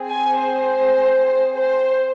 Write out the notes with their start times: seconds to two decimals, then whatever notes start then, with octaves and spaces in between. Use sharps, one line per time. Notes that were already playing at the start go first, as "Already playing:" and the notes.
Already playing: C4 G#4
0.09 G#5
0.38 C5
1.55 C5